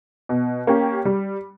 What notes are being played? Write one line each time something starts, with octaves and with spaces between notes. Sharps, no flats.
B2
A#3 C#4 G4
G3